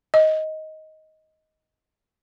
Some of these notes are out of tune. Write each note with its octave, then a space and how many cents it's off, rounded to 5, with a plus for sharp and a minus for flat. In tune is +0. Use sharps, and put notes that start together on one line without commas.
D#5 +10